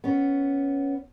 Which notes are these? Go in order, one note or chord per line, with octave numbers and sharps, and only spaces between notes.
B3 C#4